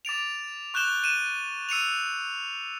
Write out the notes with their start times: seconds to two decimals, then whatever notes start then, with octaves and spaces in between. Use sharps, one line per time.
0.05 D6 A6 D7 F7
0.74 C#6 F#6 G6 E7 G7
1.03 F#6 D#7 E7
1.69 E6 C#7 D#7 F7